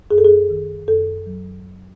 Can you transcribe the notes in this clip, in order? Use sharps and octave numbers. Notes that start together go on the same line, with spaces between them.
F#2 G#4
A4
G#4
D#3
F#2 A4
F#3